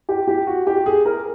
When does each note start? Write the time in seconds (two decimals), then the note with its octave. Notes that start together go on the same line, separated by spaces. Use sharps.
0.09 G4
0.27 G4
0.47 F#4
0.67 G4
0.86 G#4
1.05 A#4